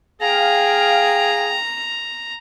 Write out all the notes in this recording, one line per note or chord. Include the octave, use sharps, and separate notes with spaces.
G#4 F5 G5 A#5